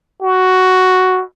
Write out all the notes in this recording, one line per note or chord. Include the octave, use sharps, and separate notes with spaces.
F#4